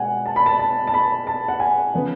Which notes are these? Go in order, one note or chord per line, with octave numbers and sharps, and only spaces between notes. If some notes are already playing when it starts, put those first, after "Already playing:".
Already playing: B2 G#3 F#5 G#5
A5
B5
A5
A5
A5
B5
A5
F#5
G#5
C#3 F3 B3